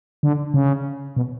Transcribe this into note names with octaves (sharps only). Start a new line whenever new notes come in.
D3
C#3
B2